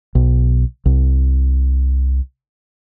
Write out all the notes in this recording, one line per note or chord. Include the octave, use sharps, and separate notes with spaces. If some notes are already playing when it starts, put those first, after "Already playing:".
B1
C2